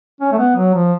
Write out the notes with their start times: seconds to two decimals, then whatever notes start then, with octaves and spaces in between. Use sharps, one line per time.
0.21 C#4
0.32 A3
0.38 B3
0.56 F#3
0.74 F3